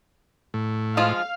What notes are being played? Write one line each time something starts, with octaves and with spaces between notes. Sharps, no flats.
A2
F3 G#3 F4 F5